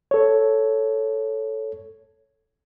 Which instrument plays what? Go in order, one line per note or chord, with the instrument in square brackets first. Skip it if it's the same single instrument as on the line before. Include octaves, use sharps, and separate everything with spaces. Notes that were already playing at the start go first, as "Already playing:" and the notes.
[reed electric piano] A4 C#5